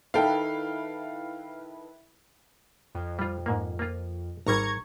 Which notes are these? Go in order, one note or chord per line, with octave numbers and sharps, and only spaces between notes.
D#3 E4 A4 B4 F5 G5
F2
G3 F4
G#2 A#3
A#3 F4
G#1 G3 A#5 C#6 G#6